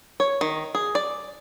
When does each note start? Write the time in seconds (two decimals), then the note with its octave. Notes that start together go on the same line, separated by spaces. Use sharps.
0.20 C#5
0.41 D#3
0.75 G#4
0.95 D5